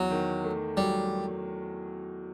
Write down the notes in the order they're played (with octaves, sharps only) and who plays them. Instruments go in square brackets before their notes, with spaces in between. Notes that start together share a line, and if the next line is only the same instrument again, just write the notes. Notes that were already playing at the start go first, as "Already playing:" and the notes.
Already playing: [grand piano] E2 [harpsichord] F#3
[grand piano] D#3
A3
[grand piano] F#3 [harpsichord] G3